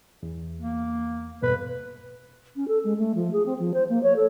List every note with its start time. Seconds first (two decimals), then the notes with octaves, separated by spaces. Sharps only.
0.23 E2
0.60 A#3
1.43 E2 G2 B2 B4
2.55 C#4
2.68 A4
2.84 G#3
2.98 A3
3.14 F3
3.32 G#4
3.45 C4
3.58 F3
3.73 C5
3.89 A#3
4.03 C#5
4.16 A4